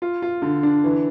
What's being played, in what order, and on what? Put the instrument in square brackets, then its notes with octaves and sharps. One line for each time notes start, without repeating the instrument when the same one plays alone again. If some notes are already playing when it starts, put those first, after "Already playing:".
[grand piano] F4
F4
D3
D4
E3